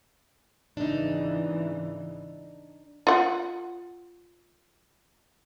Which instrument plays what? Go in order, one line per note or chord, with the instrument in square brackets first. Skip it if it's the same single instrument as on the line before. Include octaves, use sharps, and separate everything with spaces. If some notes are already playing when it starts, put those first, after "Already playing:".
[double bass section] G#1 C#3 E3 [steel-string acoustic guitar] D4 D#4
[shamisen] F4 F#5